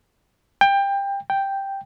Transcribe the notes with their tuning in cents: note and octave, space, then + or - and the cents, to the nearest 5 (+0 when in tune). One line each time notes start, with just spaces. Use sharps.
G5 +20
G5 +0